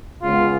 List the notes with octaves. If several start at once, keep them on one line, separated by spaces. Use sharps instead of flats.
C#2 C#3 G#3 B3 F4